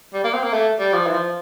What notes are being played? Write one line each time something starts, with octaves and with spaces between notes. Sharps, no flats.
G3
A#3
C4
A#3
A3
G3
F3
E3
F3